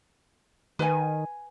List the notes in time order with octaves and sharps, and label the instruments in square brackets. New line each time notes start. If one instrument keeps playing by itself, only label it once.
[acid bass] D#3 [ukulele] B4 G#5